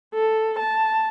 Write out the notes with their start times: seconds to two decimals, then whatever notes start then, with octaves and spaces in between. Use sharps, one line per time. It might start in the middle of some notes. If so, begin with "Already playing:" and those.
0.14 A4
0.59 A5